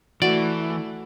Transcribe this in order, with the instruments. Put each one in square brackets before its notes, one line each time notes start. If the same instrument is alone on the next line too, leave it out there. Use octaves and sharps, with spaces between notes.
[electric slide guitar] E3 [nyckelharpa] A3 [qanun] F#4 D6 [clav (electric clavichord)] D5